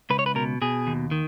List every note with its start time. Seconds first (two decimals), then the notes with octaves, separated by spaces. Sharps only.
0.10 C#2 B4
0.19 C#5
0.26 B4
0.35 B2 A#4
0.62 B2 G#4
0.87 D#2
1.11 D#3